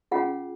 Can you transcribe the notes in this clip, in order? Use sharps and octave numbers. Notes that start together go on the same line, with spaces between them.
C#4 F4 G#4 F#5